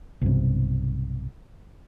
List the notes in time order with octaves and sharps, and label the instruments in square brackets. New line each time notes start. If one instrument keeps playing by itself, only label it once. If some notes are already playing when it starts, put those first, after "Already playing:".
[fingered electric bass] B1 G2 C3